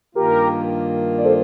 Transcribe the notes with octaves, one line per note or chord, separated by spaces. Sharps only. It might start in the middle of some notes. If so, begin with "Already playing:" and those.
G2 D#3 A#3 F4 G4 A#4
D5
A4 C5